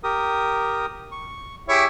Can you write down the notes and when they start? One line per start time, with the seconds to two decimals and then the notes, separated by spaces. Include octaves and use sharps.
0.04 G4 A#4 D#6
1.12 C#6
1.69 E4 G4 G#4 C#5